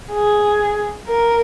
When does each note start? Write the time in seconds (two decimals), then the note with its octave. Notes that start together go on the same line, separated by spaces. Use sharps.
0.12 G#4
1.08 A#4